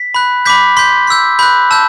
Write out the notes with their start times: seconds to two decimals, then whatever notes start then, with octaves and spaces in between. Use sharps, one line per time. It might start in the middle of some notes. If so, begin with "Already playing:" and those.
Already playing: B6
0.14 B5 F#6
0.45 B5 D6 G6 B6
0.77 C6 G6 B6
1.07 C6 E6 G6
1.39 B5 F#6 G6
1.71 A5 E6 G6